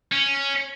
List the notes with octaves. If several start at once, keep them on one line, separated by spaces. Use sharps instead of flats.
C#4